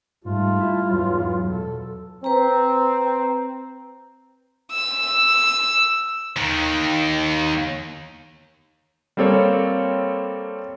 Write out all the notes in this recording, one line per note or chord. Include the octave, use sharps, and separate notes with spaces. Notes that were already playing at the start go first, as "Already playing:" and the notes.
G#2 G3 A3 F4
E4
E2 G#2 F#3
B2 A4
C4 B4 A#5
E6
D#2 D#3
G3 A#3 C4 A4 C#5